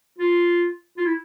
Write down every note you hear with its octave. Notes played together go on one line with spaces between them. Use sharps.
F4
F4
E4